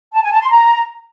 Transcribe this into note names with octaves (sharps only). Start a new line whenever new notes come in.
A5
G#5
A5
C6
A#5